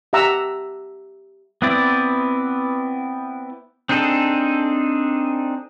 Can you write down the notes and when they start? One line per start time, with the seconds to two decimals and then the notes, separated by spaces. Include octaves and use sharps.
0.13 G4 E5 F#5 A#5 E6
1.62 B3 C4 E4 D5
3.89 C4 D4 D#4 G#4 A4